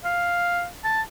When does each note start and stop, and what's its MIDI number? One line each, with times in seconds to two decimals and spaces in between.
0.05 0.66 77
0.84 1.02 81